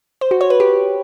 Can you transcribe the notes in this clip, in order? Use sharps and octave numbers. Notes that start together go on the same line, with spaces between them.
C5
F#4
C#5
B4
G4